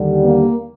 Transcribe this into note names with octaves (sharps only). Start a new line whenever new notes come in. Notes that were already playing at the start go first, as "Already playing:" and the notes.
Already playing: D#2 D3 G3
A#3